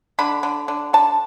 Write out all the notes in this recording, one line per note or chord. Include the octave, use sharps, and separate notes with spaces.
D3 B5
D3
D3
D3 A5